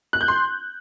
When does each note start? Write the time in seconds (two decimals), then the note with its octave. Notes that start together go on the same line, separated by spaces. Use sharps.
0.13 F#6
0.21 G6
0.28 C6